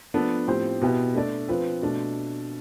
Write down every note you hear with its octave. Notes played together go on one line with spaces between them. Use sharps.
F3 B3 D4 A4
A2 F3 C4 G4 C5
B2 B3 E4 G4
A3 D4 A4 D5
F3 C4 F4 B4
B2 A3 D4